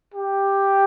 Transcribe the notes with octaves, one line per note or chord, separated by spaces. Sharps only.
G4